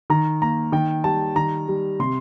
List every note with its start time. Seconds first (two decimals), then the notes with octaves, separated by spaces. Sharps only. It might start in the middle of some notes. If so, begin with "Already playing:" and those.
0.10 D#3 A#5
0.42 A#3 A#5
0.72 D#3 G5
1.04 G3 A5
1.36 D#3 A#5
1.68 G3
2.00 C3 C6